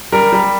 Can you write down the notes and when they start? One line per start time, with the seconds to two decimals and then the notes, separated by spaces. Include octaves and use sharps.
0.12 G3 A#4
0.33 G3